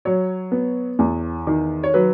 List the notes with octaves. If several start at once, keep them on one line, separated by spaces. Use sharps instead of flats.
F#3 C#5
B3
E2
D#3
C#5
F#3 B4